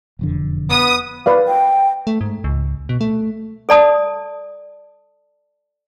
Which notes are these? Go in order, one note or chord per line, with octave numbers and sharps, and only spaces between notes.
E1 F2 D3
B3 D#6
B4 D5 F5
G5
A3
G#2
C#2
B2
A3
A4 D5 A5 D#6